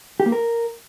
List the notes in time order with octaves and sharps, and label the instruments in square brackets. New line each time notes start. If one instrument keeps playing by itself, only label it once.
[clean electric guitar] G4
A#3
A#4